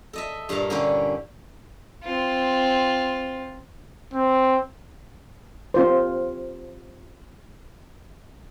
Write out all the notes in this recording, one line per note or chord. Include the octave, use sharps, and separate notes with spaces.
A4 D#5 E5
G2 A#2 A4 C#5 F5 A#5
D3 A#3 C#4 E4 G4 C#5
C4 F4
C4
C4 F4 C5